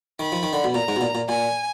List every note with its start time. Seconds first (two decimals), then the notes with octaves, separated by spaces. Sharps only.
0.19 D#3 B5
0.32 F3
0.43 D#3
0.53 D3
0.64 B2
0.75 A#2 A#5
0.88 G#2
0.96 B2
1.01 A#2
1.15 A#2
1.29 A#2 G#5